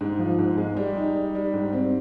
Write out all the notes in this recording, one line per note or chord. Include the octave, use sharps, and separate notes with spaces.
G#2
F3
G#2
G#3
G3
D#4
G3
G3
G#2
C4